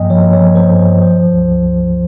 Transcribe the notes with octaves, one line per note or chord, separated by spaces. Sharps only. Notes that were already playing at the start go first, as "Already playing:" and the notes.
Already playing: G2 F3 A#3 D#5 G5 G#5
F3 C#5
C#5
F3
C5
G2
F3 C5
C#2
C#2